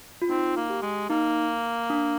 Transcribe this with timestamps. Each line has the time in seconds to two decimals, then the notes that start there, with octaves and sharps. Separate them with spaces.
0.22 F4
0.30 C4 D#4
0.57 A#3
0.70 G4
0.82 G#3
1.10 A#3 D#4
1.90 D4